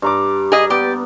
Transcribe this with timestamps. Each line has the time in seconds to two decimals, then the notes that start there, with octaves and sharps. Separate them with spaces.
0.02 G2 A#5 D6
0.52 G#4 D#5
0.70 B3 G4 D5